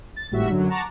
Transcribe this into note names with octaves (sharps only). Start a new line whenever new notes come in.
A6
G#1 A2 G3 F#4 E5
F#2 D3 F#3
F#5 A5 A#5 C#6 D6